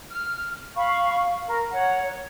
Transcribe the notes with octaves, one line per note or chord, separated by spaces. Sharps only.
F6
F5 B5 C#6
A#4
C#5 F#5